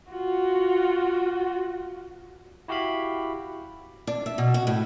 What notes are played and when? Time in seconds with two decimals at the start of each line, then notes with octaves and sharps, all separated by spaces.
0.11 F4 F#4
2.68 E4 F#4 G4 E5 F5 B5
4.07 D4
4.26 E5
4.38 B2
4.54 F#4
4.67 A2